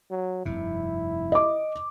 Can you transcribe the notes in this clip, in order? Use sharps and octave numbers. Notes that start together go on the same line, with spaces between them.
F#3
F1 G2 C3 E4
D#5 D6